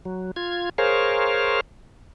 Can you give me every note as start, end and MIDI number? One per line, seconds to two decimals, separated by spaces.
0.05 0.31 54
0.36 0.69 65
0.36 0.69 92
0.78 1.61 68
0.78 1.61 70
0.78 1.61 72
0.78 1.61 73
0.78 1.61 77